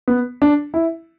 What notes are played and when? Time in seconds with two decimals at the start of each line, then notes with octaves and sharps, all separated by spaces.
0.08 B3
0.42 D4
0.74 E4